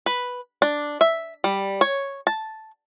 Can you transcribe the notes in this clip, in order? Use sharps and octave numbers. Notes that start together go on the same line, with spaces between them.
B4
D4
E5
G3
C#5
A5